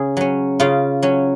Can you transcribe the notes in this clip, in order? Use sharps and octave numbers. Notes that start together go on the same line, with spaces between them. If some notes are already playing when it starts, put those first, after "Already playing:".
Already playing: C#3 G#4
F#3 C#4
C#3 F4
F#3 C#4